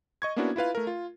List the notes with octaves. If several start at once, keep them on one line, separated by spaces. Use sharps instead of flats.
D#5 C#6 G#6
A#3 B3 C#4 D4 E4 F#4
E4 F4 B4 F5
A3 A#4
F4